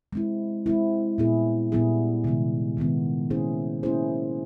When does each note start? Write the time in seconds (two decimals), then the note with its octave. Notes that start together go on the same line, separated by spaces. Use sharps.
0.13 G#3 C4 E4
0.66 G#3 C4 E4
1.18 A#2 G3 B3 E4 G#4
1.72 A#2 G3 B3 E4 G#4
2.24 C3 D#3 G#3 B3
2.77 C3 D#3 G#3 B3
3.30 A#3 C#4 E4 G#4 C5
3.83 A#3 C#4 E4 G#4 C5